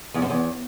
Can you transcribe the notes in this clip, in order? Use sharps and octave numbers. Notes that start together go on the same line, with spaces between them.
E2
F#2
E2